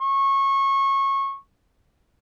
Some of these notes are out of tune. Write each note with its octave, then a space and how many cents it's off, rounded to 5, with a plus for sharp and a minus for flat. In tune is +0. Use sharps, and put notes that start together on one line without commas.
C#6 -20